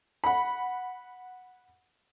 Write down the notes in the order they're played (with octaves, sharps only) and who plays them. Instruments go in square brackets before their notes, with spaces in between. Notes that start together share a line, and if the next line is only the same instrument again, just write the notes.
[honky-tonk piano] F#5 B5